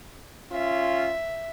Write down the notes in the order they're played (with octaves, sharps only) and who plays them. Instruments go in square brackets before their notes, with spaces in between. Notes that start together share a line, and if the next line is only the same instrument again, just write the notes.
[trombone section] C#4 F4 [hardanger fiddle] E5